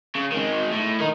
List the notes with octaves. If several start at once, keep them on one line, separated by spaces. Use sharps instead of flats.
C#3
D#3 G#3
A2
D#3 D#4